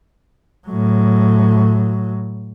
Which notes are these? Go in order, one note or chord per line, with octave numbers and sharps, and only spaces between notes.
A2 F#3